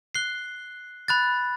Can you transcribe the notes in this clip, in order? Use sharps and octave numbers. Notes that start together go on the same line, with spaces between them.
F#6 C7 G7
B5 F#6 A6